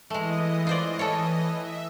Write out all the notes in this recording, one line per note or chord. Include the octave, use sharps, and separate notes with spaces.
E3 G#3 A3 D#5
F4 C5 D5
A4 C#5
E5